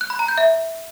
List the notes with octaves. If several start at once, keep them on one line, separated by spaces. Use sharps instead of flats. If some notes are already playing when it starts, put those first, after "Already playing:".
F#6
B5
A#5
G6
E5